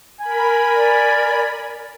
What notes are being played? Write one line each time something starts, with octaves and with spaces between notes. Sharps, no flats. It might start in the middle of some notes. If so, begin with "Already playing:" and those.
A#4 G#5 B5
D5